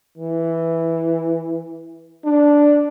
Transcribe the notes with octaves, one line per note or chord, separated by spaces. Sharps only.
E3
D4